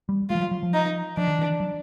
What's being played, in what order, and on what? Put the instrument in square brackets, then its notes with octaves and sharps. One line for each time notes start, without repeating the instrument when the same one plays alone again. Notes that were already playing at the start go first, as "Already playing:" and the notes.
[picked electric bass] G3
[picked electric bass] G#3 [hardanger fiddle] F4
[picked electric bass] F3
F#3
F#3
F3
[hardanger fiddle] D#4
[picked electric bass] F3 [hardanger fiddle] D4
[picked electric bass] D#3
E3
F#3